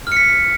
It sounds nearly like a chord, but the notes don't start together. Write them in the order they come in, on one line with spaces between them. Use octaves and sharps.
F6 C#7 B6